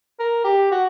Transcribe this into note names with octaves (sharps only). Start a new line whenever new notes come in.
A#4
G4
F#4